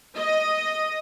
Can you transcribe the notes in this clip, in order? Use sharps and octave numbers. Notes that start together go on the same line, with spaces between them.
D#5